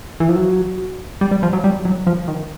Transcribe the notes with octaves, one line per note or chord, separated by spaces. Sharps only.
E3
F3
F#3
G3
G3
F3
F#3
G3
F#3
F3
D#3